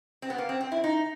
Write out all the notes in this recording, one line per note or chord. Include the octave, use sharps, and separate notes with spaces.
C4
B3
A#3
C4
C4
E4
D#4